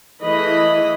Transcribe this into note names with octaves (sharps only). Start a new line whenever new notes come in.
E3 A3 G#4 D#5 B5